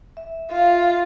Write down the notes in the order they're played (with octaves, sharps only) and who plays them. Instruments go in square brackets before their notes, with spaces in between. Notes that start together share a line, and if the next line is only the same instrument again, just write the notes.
[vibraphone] E5
[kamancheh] F4 [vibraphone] E5 F5